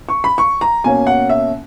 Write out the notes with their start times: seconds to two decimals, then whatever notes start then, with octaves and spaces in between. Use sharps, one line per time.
0.09 C#6
0.24 B5
0.38 C#6
0.61 A#5
0.84 B2 A#3 C#4 G#5
1.07 F#5
1.29 E5